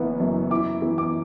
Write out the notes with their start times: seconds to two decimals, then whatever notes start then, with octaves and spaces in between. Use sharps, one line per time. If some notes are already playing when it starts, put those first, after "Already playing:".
Already playing: F#1 E3 B3
0.20 F#2
0.50 E4 D6
0.82 E3
0.98 D6